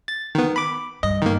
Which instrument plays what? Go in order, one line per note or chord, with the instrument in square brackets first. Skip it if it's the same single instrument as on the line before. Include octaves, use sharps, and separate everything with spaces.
[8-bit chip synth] A6
D#3 B3
B5 D6
[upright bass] G2 [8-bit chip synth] D#5
[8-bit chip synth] D#3 A#3